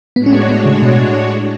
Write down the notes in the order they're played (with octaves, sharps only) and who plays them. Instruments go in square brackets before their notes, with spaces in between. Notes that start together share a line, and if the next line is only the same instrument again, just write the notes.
[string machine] A2 G#3 D4 F#4 C#5 [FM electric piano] B3
[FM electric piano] C#4
B3
B3
C#3
B2